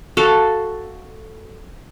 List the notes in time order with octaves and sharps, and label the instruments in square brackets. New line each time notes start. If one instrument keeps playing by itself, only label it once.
[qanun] F#4 A4 F5